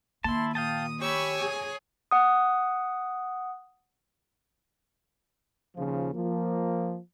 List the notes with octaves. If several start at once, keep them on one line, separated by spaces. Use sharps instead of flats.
D#3 A#3 E4 A5 C6
A#2 F5 G5 A5 D#6
G4 C#5 G#5 B5 C#6 E6
G#4
F#5 D#6
D#2 C#3 F3
F3 A#3